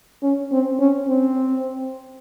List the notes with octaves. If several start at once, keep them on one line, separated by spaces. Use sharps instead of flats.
C#4
C4
C#4
C4